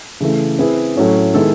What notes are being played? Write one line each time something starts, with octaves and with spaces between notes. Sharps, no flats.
C#3 E3 A3
C4 E4 G#4 B4
A2 F#3 A3 C#4 E4
D#3 G#3 B3 E4 A4